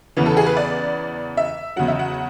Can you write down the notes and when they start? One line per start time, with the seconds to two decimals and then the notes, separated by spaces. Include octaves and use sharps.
0.17 E2 C#3 E3 B4
0.26 A4
0.37 G#4
0.46 B4
0.57 D5
1.37 E5
1.76 E2 C#3 F#3 F#5
1.88 E5
1.99 F#5